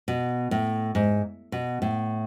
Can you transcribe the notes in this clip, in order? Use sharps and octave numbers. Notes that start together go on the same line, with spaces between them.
B2
A2
G#2
B2
A2